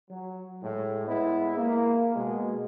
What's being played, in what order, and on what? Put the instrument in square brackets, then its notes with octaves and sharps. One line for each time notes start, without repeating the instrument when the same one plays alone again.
[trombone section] F#3
A2 G#3
G#3 B3 E4
A#3
B2 G#3